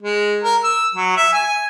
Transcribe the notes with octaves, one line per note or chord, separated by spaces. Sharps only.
G#3
A#4
E6
F#3
E5
G#5